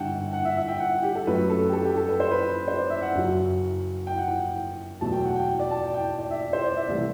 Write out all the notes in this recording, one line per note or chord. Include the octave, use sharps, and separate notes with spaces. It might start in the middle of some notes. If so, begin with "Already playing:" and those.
Already playing: G1 G2 D3 F#5 G5 A5
F#5
E5
E5
G5
F#5
G4
A4
F#2 F#3 A3 B4
A4
G4
A4
G4
A4
B4
C5
B4
C5
D5
E5
F#5
F#1 F#2 F#3
G5
F#5
G5
E2 B2 F#3 A3 A5
G5
F#5
G5
G5
D5
A5
G5
G5
D5
E5
C5
D5
E5
C2 C3 E3 A3